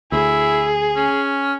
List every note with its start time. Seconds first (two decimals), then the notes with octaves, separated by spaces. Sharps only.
0.12 D2 E4 G#4
0.96 C#4